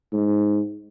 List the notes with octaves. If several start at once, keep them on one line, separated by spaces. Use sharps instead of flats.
G#2